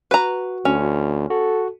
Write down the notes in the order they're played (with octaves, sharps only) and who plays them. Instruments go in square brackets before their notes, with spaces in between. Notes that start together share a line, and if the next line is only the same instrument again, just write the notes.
[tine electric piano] F#4 [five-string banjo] B4 A#5
[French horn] D2 [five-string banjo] C#4
[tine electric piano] F#4 [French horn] A4